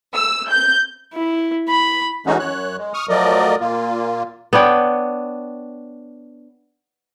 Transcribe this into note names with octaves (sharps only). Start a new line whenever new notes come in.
E6
G6
E4
B5
E3 G#3 A3 C#4 D#4 F#4
F#2 C#5 F#6
G#3
C#6 D#6 F6
F3 F#3 A3 A#4 D5 D#5
A#2 A#3 F4
B3 D4 C#5 G5